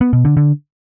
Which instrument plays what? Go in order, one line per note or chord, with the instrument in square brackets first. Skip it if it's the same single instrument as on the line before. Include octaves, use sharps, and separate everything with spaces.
[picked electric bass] B3
B2
D3
D3